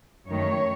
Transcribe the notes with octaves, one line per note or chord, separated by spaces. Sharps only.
F#2 D#3 A3 C#5